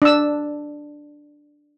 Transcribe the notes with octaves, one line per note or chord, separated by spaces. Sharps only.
D4 E6